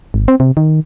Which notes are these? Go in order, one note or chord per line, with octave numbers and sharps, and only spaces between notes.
G#1
C4
C3
D#3